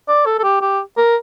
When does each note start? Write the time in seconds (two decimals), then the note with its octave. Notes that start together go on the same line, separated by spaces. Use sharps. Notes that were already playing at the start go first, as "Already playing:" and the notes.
0.08 D5
0.26 A4
0.39 A4
0.43 G4
0.61 G4
0.97 A#4